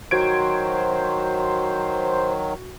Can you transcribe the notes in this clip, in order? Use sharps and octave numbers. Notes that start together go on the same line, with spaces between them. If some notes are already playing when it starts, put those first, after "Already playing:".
D#3 F#3 F#4 C5 G#6 D7